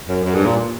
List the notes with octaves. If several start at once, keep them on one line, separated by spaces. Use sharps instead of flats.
F#2
F#2
G2
A#2